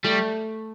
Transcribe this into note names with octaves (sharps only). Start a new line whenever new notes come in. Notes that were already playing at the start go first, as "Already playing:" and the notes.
G3 A3